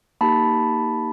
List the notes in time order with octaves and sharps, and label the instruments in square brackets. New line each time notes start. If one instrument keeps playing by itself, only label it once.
[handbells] A#3 D#4 G4 A5 B5